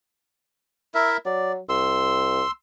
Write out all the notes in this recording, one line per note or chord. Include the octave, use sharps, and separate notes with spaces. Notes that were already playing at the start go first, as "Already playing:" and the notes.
E4 A#4 E5
F#3 D5
C2 C6 E6